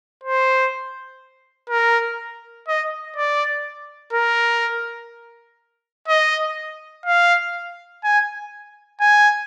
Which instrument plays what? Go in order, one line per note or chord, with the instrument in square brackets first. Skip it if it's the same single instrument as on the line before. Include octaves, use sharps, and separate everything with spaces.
[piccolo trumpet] C5
A#4
D#5
D5
A#4
D#5
F5
G#5
G#5